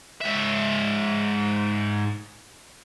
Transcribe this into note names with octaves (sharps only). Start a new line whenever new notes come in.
G#2 E5